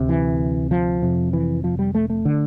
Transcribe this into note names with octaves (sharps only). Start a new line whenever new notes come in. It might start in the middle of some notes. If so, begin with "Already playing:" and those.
Already playing: D2 C3
E3
F3
F2 C3
E3
F3
G3
A3
A3
D3